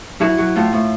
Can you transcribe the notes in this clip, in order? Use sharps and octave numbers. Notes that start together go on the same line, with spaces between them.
F#3 E4
F#3
A2 F4
A2